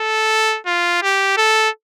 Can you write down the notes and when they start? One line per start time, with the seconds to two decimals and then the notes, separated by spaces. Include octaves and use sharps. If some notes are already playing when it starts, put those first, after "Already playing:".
Already playing: A4
0.66 F4
1.02 G4
1.37 A4